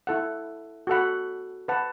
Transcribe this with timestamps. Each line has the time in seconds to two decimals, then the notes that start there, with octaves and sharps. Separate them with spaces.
0.07 E4 A4 F#5
0.87 F#4 A4 F#5 B5
1.68 B4 F#5 A5